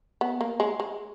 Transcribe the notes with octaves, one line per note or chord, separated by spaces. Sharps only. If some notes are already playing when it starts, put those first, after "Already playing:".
B3
A#3
G#3
G#3